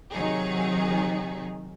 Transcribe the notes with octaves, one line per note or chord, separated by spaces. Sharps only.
C3 D#3 F#3 D#4 G#4